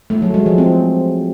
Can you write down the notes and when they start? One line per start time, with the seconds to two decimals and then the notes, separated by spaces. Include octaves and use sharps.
0.10 A3
0.22 F#3
0.34 G#3
0.46 F3
0.58 C4